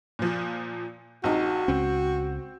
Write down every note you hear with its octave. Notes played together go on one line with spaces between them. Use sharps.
A#2 F3
A#1 C4 D#4 F#4
C#2 C4 C#4